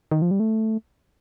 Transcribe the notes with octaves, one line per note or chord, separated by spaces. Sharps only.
D#3
F3
G3
A3